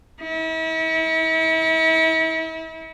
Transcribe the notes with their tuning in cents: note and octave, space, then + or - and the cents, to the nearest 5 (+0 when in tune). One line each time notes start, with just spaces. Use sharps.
E4 -40